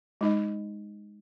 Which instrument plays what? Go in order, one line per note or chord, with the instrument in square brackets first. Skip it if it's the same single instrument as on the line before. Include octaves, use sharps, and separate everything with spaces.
[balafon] G#3 D#4 D#5